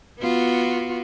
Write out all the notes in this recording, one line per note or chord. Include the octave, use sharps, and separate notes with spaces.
B3 F4 F#4